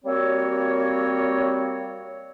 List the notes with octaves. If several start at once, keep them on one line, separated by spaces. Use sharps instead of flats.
G3 A#3 C4 F#4 C#5